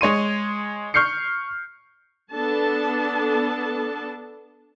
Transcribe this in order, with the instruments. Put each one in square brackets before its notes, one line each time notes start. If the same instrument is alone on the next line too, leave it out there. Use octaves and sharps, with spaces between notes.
[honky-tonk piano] G#3 C#5 C6 D#7
C#6 F6 G6 C7 C#7
[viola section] B3 D4 A4 A5